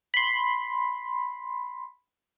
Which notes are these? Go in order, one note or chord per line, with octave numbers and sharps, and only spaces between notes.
B5 C6